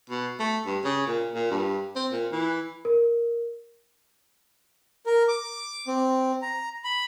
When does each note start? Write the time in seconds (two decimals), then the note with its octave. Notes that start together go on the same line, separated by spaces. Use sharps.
0.10 B2
0.40 A3
0.66 G2
0.84 C#3
1.07 A#2
1.34 A#2
1.50 G2
1.96 C4
2.12 A#2
2.32 E3
2.85 A#4
5.06 A#4
5.28 D6
5.87 C4
6.42 A#5
6.84 B5